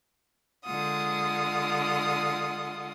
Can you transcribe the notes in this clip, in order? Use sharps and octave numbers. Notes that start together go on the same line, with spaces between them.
D3 G#3 F4 F#5 D#6